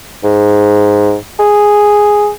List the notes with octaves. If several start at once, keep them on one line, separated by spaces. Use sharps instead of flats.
G#2
G#4